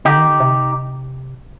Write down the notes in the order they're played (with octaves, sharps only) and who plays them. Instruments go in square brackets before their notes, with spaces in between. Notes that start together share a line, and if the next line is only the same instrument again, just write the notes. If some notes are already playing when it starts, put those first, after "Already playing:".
[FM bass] D3 [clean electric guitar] D#4 G4
[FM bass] D#3
D3
C3